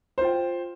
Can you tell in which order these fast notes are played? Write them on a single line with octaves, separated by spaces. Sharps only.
C5 F4 G5